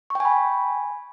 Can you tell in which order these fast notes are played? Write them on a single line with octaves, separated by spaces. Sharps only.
C#6 G5 G#5 B5